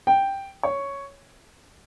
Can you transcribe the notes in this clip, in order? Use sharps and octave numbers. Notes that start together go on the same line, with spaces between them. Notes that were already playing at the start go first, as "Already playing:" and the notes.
G5
C#5